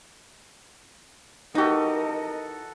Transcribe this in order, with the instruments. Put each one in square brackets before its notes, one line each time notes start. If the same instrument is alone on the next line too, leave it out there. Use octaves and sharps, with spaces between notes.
[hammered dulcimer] E3 F#4 A4 [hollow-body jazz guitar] D#4 G4 [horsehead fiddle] A#4 D#5